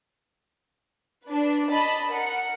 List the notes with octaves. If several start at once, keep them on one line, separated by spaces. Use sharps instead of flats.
D4 B4
D#5 A5 B5
A#4 F#5 C#7